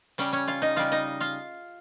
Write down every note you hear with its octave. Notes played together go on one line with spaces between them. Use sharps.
C#3 G3 C#4 C#5
C#4 C#5
F4 F5
D#4 D#5
C#3 G3 F4 F5
D#4 D#5
F4 F5